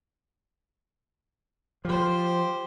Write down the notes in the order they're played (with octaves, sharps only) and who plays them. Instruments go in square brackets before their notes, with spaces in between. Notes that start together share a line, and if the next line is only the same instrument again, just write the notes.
[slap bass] F3 [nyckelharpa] G4 C5